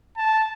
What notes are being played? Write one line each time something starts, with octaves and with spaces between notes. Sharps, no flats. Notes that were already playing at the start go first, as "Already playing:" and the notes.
A5